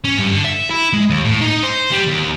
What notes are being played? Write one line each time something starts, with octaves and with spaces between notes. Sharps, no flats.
C#4
G2
D3
E5
E4
G#3
D#2
A2
D#4
C5
G3
D#2